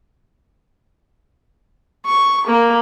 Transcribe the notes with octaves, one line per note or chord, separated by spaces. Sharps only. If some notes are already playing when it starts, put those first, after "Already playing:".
C#6
A#3